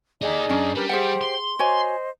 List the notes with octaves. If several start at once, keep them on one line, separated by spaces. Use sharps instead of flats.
D#4 G4 G#4 D5 D#5
F#2 C#4 D4
G3 G4 A#4 B4
G4 G#4 C5 E5 F#5 G5
C6
F#4 C5 C#5 D#5 G#5